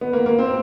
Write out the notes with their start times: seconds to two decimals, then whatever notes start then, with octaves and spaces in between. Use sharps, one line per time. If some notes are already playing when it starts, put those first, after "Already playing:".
0.01 B3
0.13 A#3
0.26 A#3
0.39 C4